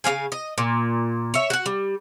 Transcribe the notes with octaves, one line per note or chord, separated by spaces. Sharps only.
C#3 C#4 F5 G#5
D#5
A#2
C#5 E5
F#4 F#5
G3